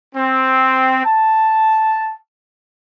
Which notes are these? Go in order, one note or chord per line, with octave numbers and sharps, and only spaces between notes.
C4
A5